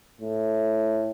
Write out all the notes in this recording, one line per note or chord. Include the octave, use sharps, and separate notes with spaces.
A2